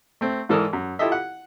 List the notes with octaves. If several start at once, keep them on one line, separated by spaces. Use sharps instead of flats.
A3 C4
G#2 E3 A4 A#4 D5 D#6
F#2
E4 F4 G4 A4 D#5 E5
F#5